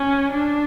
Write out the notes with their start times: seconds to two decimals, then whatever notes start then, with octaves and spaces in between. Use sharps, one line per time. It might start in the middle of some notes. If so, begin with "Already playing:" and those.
Already playing: C#4
0.31 D4